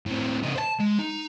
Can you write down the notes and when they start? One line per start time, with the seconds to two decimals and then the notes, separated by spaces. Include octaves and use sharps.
0.06 A2 C4
0.43 C#3 D#4
0.56 C5 A5
0.80 G#3
0.99 D#4